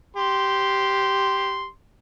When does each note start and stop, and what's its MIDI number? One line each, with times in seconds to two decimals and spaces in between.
0.16 1.67 67
0.16 1.67 84